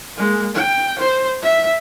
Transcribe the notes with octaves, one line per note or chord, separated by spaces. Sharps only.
G#3 A#3
G5
C5
E5